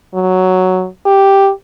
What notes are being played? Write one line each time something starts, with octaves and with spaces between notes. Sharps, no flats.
F#3
G4